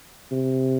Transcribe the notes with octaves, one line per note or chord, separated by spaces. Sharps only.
C3